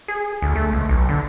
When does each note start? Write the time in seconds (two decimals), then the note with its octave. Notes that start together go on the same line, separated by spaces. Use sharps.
0.08 G#4
0.42 D2
0.56 A3
0.72 C#2
0.89 B1
1.09 D3